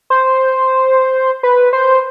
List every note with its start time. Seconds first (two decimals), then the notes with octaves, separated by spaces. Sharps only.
0.10 C5
1.43 B4
1.73 C5